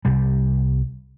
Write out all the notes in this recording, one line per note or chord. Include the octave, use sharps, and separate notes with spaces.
C2 C3 G3